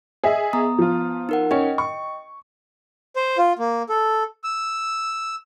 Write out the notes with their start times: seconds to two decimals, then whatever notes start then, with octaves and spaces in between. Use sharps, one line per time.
0.24 G#4 D#5 E5
0.53 B3 A#5 D#6
0.78 F3 F4
1.29 D#4 A#4 F#5
1.51 C#4 D#5 G5
1.78 C#6
3.16 C5
3.38 F4
3.59 A#3
3.89 A4
4.44 E6